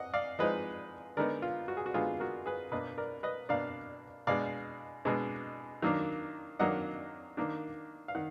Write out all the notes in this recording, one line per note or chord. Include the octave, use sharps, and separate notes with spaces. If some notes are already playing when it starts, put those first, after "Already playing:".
Already playing: D#5 F#5
D5 F5
F3 G#3 D#4 B4 D#5
D3 G#3 B3 D#4 A#4 D5
F4
F#4
G#4
F#4
D3 G#3 B3 D#4 F4 G#4
F#4 A#4
G#4 B4
B2 A#3 D4 B4 D#5
A#4 D5
B4 D#5
B2 A#3 D4 D5 F5
B2 G#3 D4 D5 F5
B2 G#3 D4
D#3 F#3 A#3 D4
D#3 F#3 A#3 D4 D#5 F#5
D#3 A#3 D4
F5
D#3 F#5